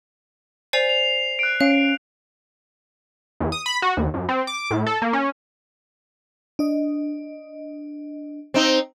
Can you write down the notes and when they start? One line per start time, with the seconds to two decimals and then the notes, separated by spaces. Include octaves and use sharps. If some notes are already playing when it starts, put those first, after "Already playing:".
0.73 C5 D5 G#5 C7 F7
0.89 F7
1.39 F#6 D7
1.61 C#4 F5
3.40 E2
3.52 D#6
3.66 B5
3.82 F#4
3.97 D#2
4.14 F#2
4.29 C4
4.47 D6
4.71 A2
4.86 A4
5.02 A#3
5.13 C#4
6.59 D4 D#5
8.54 C4 D#4